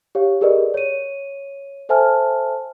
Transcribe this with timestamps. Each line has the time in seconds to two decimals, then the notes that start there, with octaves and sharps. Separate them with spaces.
0.15 G4 C#5 F5
0.41 G4 G#4 A#4 B4 D5 D#5
0.74 C#5 D#7
1.89 A4 C5 E5 G#5 A5 F6